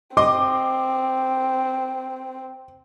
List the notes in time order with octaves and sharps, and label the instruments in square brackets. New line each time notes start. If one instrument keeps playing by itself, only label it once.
[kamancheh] C4 [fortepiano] D#5 C6 [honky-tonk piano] D6